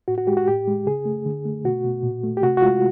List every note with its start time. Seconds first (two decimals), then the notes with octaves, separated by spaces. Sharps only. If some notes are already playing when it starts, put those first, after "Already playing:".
0.08 A2 F#4
0.18 F#4
0.27 G#3 G4
0.37 F#4
0.48 A2 G4
0.67 G#3
0.86 C#3 G#4
1.05 A3
1.26 D3
1.45 A3
1.64 B2 F#4
1.85 B2
2.03 A#2
2.24 A3
2.37 G4
2.42 C3 F#4
2.57 F#4
2.62 G#3 F4